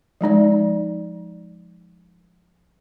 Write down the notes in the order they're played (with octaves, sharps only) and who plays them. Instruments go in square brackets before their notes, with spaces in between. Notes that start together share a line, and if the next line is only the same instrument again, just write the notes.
[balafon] F3 G#3 D#4 D5